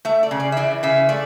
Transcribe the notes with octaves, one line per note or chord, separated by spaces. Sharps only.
A3 E5
D5
C#3
D5
E5
E3 D5
C#3 E5
A3 D5